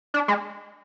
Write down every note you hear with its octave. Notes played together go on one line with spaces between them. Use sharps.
D4
G#3